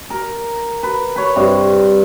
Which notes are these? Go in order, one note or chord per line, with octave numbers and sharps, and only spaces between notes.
A#4
B4
B4 C#5
G2 C3